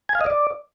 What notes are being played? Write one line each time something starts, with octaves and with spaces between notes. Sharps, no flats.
G#5
F5
D#5
D5